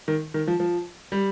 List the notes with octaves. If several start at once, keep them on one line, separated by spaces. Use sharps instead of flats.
D#3
D#3
F3
F3
G3